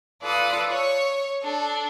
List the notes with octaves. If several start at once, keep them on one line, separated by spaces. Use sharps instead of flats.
F4 A4 B4 D5 D#6
C#5 C#6
D4 A4